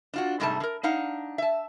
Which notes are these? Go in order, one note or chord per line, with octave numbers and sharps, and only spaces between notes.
D4 F4 F#4
G#2 C3 G3 A3 G#4 A5
D3 A#4
D4 D#4 F5 F#5
E5 A5